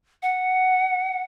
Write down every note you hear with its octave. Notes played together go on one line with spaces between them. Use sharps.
F#5